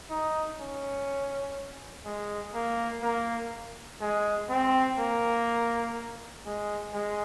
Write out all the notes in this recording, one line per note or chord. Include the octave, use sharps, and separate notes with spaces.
D#4
C#4
G#3
A#3
A#3
G#3
C4
A#3
G#3
G#3